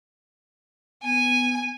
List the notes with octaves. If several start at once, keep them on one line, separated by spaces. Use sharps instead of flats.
B3 G#5